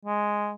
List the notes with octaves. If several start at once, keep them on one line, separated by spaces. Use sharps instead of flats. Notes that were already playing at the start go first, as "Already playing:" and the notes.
G#3